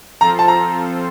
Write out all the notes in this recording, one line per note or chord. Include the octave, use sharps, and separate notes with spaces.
F3 C4 F4 A4 C5 A#5
A5
A#5